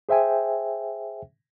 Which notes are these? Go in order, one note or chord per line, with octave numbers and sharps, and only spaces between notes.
G#4 C5 E5 G5 G#5